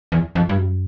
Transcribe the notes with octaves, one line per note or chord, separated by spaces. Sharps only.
E2
F2
G2
F#2